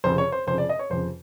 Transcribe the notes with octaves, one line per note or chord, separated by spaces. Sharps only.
F1 F2 C#3 C5
C#5
C5
F1 F2 C#3 C5
D5
D#5
C#5
F1 F2 C#3 C5